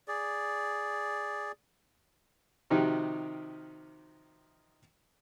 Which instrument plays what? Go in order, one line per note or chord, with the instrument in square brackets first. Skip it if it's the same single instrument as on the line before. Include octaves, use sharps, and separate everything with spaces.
[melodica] G#4 D5
[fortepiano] C3 D#3 F3 D#4 F#4 G4